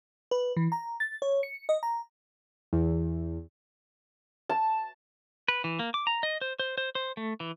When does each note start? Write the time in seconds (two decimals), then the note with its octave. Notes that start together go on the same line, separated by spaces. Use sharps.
0.31 B4
0.57 E3
0.72 A#5
1.00 A6
1.22 C#5
1.43 C#7
1.69 D#5
1.83 A#5
2.73 E2
4.49 A5
5.48 B4
5.64 E3
5.79 A#3
5.94 D6
6.07 A#5
6.23 D#5
6.41 C5
6.59 C5
6.78 C5
6.95 C5
7.17 A3
7.40 E3